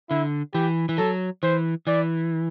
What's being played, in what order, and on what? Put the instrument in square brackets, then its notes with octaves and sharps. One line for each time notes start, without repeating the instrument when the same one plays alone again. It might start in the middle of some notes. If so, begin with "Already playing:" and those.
[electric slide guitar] D3 [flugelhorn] E4
[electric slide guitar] E3 [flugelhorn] G4
[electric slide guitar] E3
[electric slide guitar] F#3 [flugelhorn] A4
[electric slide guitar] E3 [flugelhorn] C5
[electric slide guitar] E3 [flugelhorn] D5